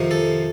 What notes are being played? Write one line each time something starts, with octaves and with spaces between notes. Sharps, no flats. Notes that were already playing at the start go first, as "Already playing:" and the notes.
Already playing: F2 C3 D#3
A4